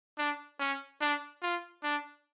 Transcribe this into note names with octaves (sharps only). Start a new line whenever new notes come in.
D4
C#4
D4
F4
D4